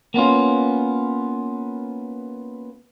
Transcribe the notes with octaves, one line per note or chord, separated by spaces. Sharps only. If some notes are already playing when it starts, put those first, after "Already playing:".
A#3 B3 C#4 F4